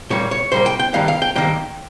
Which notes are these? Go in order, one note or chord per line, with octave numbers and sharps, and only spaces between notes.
A#2 G3 A#3 C#5
C#5
A#2 G3 A#3 C5
G5
G5
G2 D#3 G3 A#3 F5
F5
G5
G2 D#3 G3 A#3 G5